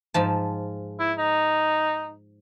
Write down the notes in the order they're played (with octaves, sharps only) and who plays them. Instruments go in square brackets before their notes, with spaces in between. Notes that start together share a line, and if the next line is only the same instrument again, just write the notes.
[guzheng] G#2 F3 A5
[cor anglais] E4
D#4